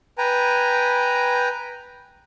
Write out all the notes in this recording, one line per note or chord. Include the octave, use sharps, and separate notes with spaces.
B4 G5 G#5 A#5